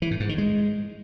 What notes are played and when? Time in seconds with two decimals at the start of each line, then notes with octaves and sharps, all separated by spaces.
0.02 E3
0.11 A2
0.20 G#2
0.29 D#3
0.38 G#3